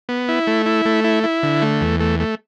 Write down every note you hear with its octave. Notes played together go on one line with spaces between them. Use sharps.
B3
E4
A3
E4
A3
E4
E4
D3
A3
E2
A3
A3